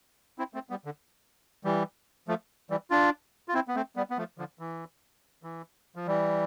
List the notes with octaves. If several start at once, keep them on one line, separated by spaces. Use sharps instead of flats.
C4 E4
A3 C4
G3 B3
D3
E3 G3
F3 A3
E3 G3
D4 F4
F4
C4 E4
B3
A3 C4
G3 B3
B3
F3 A3
D3 F3
E3
E3
F3
E3 G3